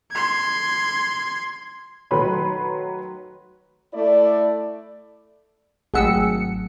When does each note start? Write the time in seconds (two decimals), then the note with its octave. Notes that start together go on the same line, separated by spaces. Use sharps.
0.12 C6 G#6
2.11 D#3 F#3 A3 B4 B5 C6
3.93 A3 E4 D5
5.94 G#1 F#3 A3 G#4 F#5 G5 E6 C#7